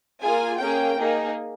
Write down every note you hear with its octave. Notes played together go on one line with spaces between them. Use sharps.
A#3 F4 G#4 G#5
A#3 C#4 G#4 G5
A#3 D#4 G#4